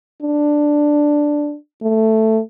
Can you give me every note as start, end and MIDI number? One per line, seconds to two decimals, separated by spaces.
0.22 1.55 62
1.83 2.40 57